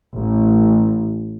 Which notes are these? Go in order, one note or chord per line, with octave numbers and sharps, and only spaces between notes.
A1